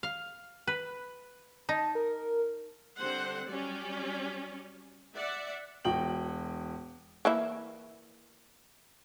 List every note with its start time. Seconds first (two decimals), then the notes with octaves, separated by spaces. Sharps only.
0.03 F5
0.67 B4
1.69 D#4 A5
1.95 A#4
2.99 D3 G3 C4 C5 F#5
3.48 F#3 G3 C#4 D5
5.15 D5 E5 F#5
5.85 E1 F#4 G5 F#7
7.25 E3 A#3 E4